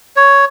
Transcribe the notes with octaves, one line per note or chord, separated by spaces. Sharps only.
C#5